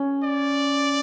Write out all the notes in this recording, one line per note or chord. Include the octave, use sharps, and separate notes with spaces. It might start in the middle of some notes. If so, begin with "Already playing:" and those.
Already playing: C#4
D5